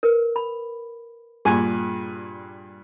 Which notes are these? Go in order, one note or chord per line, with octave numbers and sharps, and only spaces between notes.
A#4 B4
B5
G2 A#2 G#4 G#5